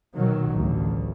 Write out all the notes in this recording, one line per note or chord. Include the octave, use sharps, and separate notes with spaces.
B2 D#3 F#3
A1 D2